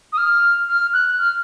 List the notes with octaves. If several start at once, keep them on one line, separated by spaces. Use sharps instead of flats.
D#6
F6
F6
F#6
F6